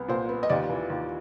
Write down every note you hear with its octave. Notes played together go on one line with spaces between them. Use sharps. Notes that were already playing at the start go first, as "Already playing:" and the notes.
Already playing: C2 B3
A#2 C5
B3
D#5
D#2 D5
E3
D#2